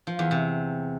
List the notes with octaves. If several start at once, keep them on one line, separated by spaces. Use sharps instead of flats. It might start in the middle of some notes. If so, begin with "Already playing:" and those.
F3
E2
C3